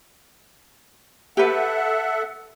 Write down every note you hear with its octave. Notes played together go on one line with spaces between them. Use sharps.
G4 A4 B4 E5 F#5